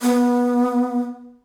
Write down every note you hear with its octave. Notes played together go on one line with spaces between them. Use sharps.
B3